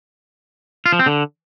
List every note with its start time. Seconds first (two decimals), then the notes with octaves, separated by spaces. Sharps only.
0.86 F4
0.92 F3
0.99 C4
1.06 D3